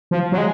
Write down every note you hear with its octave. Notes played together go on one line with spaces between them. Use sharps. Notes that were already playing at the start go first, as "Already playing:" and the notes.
F3
F#3
G#3